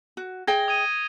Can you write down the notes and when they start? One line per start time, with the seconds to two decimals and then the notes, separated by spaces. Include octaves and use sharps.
0.17 F#4
0.47 G#4 D#5 G5 G#6 A#6 G7
0.68 D#6 G#6 D#7